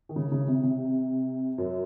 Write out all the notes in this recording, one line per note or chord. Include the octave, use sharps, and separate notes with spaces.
D#3
C#3
C#3
C3
C3
F#2